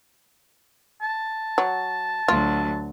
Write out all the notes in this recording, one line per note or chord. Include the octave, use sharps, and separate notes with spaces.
A5
F#3
D2 F#3 F4